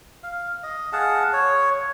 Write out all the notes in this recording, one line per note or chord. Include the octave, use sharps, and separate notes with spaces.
F5
D#5
G#4 F5 F#5 A5
C#5